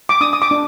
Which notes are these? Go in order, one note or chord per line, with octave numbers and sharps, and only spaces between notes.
D6
D4 D#6
D#6
D6
D4